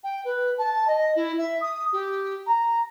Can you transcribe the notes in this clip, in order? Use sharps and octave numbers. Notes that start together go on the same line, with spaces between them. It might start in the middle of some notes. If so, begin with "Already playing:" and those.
G5
B4
A5
D#5
E4
E5
D#6
G4
A#5